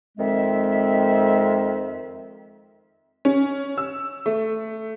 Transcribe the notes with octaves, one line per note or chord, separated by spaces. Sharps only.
F2 D#3 G#3 C4 E5
C#4
E6
A3